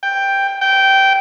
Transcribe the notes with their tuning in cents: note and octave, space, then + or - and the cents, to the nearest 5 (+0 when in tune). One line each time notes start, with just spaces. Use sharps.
G5 +5
G5 -15